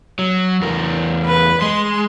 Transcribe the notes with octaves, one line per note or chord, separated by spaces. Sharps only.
F#3
E2 A#4
B4
G#3 C6